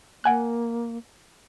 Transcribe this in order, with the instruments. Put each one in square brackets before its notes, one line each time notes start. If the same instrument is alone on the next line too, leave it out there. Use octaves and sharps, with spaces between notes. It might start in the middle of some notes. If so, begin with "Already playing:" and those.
[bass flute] A#3 [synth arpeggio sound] F#5 G#5 F#6